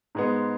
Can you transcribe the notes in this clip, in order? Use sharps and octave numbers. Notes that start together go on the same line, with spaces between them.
G#2 G#3 B3